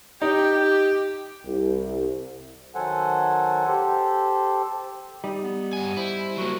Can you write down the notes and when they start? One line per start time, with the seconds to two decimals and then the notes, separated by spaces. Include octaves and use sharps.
0.22 D#4 G4
1.46 C2
2.75 D#3 F#3 A4 C5 F#5 G#5
3.67 G4 A4 C5
5.24 G3 D#4
5.43 B3
5.73 G2 G#5
5.97 E4 C5
6.37 F#3 A#3 F#4